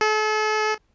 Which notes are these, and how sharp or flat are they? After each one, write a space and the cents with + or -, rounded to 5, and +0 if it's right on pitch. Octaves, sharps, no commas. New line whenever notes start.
A4 -40